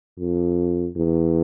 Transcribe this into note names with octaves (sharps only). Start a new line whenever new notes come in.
F2
E2